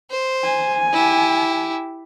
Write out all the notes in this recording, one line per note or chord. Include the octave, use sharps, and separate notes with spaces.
C5
G#5
E4 G4